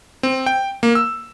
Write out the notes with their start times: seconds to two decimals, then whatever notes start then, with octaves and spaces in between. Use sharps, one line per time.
0.23 C4
0.46 G5
0.83 A#3
0.95 E6